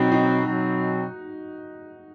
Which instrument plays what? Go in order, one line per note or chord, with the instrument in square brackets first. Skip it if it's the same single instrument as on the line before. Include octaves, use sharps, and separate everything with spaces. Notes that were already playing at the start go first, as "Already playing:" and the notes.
Already playing: [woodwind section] B2 F#3 C4 [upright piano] D#4 F#4
[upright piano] D#4
[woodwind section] B2 F#3 C4